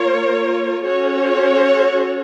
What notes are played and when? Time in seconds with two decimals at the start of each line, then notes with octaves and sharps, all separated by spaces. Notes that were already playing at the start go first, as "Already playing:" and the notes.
Already playing: A#3 F4 A#4 C#5
0.85 C#4 F#4 A4 C#5